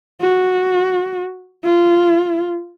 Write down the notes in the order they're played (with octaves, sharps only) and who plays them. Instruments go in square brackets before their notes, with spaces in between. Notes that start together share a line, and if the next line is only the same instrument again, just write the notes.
[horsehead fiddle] F#4
F4